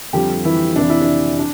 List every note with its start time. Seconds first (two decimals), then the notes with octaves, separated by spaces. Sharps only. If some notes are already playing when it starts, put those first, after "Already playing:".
0.13 F2 D3 F3 G3 G4
0.44 E3 E4
0.76 F2 C3 E3 D4
0.89 E4
1.01 D4
1.39 D4